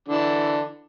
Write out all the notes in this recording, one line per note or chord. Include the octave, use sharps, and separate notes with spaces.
D3 E3 D4